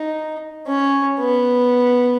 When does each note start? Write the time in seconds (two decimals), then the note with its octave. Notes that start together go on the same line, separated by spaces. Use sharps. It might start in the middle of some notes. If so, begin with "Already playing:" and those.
Already playing: D#4
0.68 C#4
1.20 B3